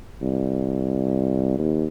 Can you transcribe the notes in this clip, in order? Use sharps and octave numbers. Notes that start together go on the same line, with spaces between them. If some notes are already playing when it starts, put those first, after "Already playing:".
C2
D#2